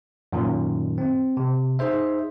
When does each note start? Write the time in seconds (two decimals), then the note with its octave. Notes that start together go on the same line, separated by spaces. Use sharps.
0.33 F#2 A#2 D#3
0.98 C4
1.37 C3
1.79 D#4 G#4 C5 E5